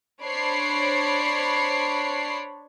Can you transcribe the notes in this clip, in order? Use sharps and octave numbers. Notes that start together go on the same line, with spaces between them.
D4 C5 C#5 B5 C7 D7